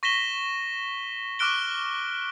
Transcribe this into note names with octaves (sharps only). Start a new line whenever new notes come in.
C#6 A#6 B6 E7 G7
C#6 D6 F6 F#6 D7 G7